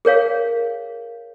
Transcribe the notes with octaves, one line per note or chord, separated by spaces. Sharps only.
G#4 A#4 C#5 F5